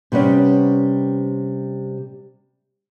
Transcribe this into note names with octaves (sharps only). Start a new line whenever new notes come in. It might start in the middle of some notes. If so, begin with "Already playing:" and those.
C3 G3 B3 C#4